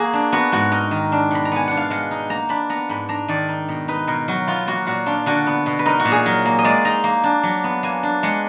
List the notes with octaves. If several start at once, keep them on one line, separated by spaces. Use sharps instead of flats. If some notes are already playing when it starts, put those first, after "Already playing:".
Already playing: A#3 F#4 G#4
D4
B3 F#4
G#2 F#4
D#4 A#4
D#3
D4
B2 B5
A#5
B3 G#5
D4 F#5
F5
G#3 F#5
D#4
A#3 A#5
D4 B5
B3 A#5
G#2 B5
D4 A#5
D#3 D5
D#4
B2
D#4 B4
B2 A#4
F#3 F#4
B3 F4
A#3 F#4
A#2 F#4
D4 F4
D3 F#4
B3
B2
B4
D#4 A#4
F#4
A#2
G#4
F#3 A#4
A#3
D#5
G#3 D5
D#4 A#5
A#3
D4
F#3
B3
A#3 G#5
D4
G#3 F#5